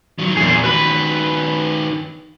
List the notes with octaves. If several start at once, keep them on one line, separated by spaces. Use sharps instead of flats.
D#3 F#3
E2 A#2 G#4
D#3 F#4 B4 B5